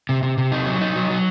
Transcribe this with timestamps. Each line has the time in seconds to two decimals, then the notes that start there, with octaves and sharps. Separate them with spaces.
0.09 C3
0.23 C3
0.38 C3
0.52 D#4
0.67 F#3
0.81 D#4
0.96 F#3
1.10 F#3